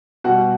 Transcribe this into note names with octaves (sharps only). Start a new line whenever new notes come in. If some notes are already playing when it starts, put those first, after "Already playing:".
B2 G3 F#4 F#5